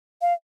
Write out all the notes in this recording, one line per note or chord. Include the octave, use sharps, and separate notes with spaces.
F5